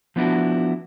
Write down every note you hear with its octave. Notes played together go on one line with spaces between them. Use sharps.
F3 B3 D4 E4 F#4